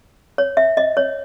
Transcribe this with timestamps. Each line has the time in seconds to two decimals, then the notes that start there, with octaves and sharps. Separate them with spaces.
0.38 C#5
0.57 E5
0.77 D#5
0.97 C#5